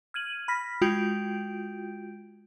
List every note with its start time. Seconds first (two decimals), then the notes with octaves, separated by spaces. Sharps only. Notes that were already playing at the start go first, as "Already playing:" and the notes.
0.14 F6 G#6 D#7 F#7
0.48 B5 F6 A#6 B6
0.82 G#3 F4 F#4 G5 G6 D7